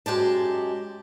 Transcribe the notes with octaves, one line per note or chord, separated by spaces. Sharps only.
F#2 G#3 G4 A5